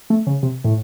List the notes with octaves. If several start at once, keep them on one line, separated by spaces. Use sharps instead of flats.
A3
C#3
C3
A2